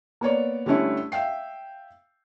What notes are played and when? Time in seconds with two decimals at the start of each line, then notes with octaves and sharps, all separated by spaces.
0.21 A#3 B3 C#5 D5
0.66 D3 G3 A3 C#4 E4
1.12 E5 F5 G5 C7